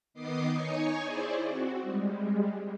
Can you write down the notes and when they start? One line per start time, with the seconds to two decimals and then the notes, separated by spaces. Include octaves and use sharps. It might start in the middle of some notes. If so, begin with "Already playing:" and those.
0.14 D#3 B3 D#5 D6 D#6 C7
0.52 D#4 C#5 G#5 C#6
1.02 E4 G#4 C5 D5
1.46 C4 F#4
1.82 G3 G#3